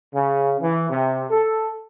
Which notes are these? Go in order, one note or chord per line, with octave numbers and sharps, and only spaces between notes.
C#3
E3
C3
A4